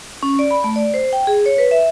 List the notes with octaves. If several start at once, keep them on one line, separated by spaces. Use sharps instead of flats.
C#4
D5
B5
A3
D5
C5
G5
G#4
C#5
B4
E5